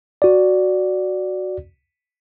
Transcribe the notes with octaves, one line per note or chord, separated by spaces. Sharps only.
F#4 D5